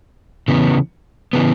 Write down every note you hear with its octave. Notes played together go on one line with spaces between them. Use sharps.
C#3 E3 B3
C#3 E3 B3